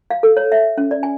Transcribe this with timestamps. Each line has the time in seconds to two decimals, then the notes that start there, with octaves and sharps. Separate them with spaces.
0.10 F5
0.23 A4
0.37 C#5
0.52 E5
0.78 C#4
0.91 D5
1.03 G#5